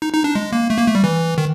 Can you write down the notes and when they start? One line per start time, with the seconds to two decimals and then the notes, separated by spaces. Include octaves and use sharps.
0.02 D#4
0.13 D#4
0.24 D4
0.35 G#3
0.52 A#3
0.70 A3
0.78 A#3
0.87 A3
0.95 G3
1.04 E3
1.38 D#3